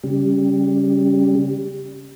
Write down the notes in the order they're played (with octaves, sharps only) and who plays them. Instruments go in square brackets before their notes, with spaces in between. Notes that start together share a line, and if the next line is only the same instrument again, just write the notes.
[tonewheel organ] C#3 G3